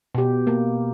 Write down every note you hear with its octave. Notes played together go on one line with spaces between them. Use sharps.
B2 G4
A#3